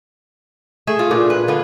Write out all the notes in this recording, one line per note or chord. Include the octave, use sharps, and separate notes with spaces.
A3 G#4 E5
F4
A#2 D4
B4
D3 B3 F4